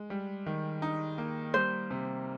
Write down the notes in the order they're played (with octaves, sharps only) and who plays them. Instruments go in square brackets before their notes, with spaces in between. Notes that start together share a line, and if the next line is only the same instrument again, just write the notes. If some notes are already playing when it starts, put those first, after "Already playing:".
Already playing: [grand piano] G#3
G3
D#3
D#4
A#3
[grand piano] G3 [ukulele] C5
[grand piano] C3